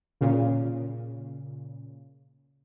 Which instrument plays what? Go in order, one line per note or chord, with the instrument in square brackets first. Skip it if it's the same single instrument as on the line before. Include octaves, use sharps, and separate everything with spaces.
[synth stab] A#2 C#3